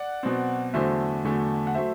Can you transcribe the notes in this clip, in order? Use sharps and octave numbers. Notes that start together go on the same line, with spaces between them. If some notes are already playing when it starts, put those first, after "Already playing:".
Already playing: D5 F#5
B2 F#3 C4
E2 D3 F#3 A3 C5 E5
E2 D3 F#3 A3
F#5
F#3 A3 C5 E5